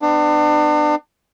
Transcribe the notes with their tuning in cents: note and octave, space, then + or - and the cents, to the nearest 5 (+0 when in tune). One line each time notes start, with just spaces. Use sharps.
B3 +35 D4 +35